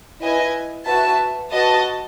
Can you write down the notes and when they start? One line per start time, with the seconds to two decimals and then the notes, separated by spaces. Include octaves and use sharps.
0.22 E4 B4 D#5 G#5
0.87 F#4 B4 E5 A5
1.52 F#4 B4 D#5 A5